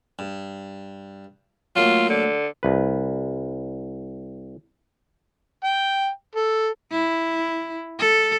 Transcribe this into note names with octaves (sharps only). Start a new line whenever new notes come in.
G2
F#3 A3 A#3 F4
D3
C2 B4
G5
A4
E4
A4